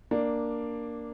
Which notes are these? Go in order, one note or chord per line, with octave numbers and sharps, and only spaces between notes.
A#3 D4